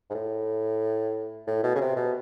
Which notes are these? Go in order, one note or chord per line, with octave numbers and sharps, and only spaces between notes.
G#2
A2
A2
B2
C#3
C3
B2